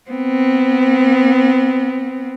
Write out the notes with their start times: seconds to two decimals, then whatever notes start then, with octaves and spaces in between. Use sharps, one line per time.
0.10 B3 C4